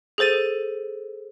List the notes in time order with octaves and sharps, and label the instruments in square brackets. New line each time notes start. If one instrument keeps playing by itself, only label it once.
[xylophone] G#4 A4 C5 A6 D#7